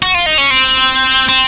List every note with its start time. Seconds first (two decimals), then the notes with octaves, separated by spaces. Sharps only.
0.02 F#4
0.14 F4
0.26 D#4
0.38 C#4
0.50 C4
1.29 C4